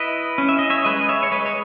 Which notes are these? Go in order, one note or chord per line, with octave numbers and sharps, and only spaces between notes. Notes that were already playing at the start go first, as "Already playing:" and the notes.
Already playing: E4 B4 D#5
C#4
E5
D#5
C#5 E5
G#3 B4 D#5
D#5
C#5 E5
C#5
G#3 B4 D#5
C#5